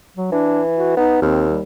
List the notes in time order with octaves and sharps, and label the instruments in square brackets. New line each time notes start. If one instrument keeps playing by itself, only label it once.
[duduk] F#3
[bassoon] E3 [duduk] D4
[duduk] F#4
[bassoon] B3 [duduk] D#4
[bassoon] D#2 [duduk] C4
[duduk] G3